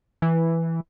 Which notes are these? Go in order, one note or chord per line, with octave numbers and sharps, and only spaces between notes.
E3